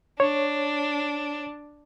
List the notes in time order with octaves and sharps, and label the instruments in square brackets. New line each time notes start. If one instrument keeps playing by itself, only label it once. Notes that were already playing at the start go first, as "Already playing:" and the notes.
[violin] D4 [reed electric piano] C#5